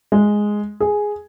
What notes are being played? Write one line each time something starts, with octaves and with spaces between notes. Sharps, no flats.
G#3
G#4